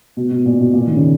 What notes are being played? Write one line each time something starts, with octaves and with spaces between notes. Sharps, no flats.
B2
B2
A#2
B2
A#2
D#3
C#3